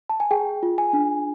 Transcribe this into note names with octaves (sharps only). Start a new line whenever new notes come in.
A5
G#5
G#4 G5
F4
G#5
D4